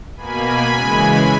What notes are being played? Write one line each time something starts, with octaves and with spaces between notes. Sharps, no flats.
B2 A#3 G#5 B5
C#3 E3 G#3